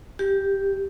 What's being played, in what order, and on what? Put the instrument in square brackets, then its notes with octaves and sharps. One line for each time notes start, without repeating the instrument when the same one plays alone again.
[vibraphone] G4